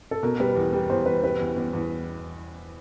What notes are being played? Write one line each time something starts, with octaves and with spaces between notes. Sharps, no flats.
A4
B2 A#4
G3 B4
E2
G3
E2 C5
E2 B4
G3 B4
E2
E2
E2